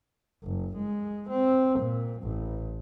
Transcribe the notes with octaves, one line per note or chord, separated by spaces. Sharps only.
F#1
G#3
C4
A#2
A1